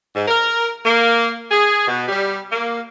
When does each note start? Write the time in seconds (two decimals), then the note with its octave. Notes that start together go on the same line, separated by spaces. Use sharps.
0.15 G#2
0.27 A#4
0.85 A#3
1.51 G#4
1.87 B2
2.08 G3
2.52 A#3